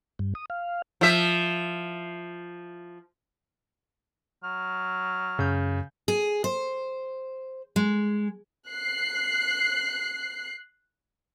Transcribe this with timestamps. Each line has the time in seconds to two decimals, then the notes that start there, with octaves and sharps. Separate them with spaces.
0.19 G2
0.35 D#6
0.50 F5
1.01 F3 E5
4.44 F#3 F6
5.39 F#2 C#3 G6
6.08 G#4
6.44 C5
7.76 G#3
8.70 F#6 C7